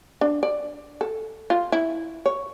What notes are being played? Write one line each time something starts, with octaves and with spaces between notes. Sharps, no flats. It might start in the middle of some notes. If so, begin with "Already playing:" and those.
D4
D5
A4
F4
E4
C#5